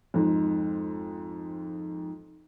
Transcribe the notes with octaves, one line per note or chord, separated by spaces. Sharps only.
F2 G#2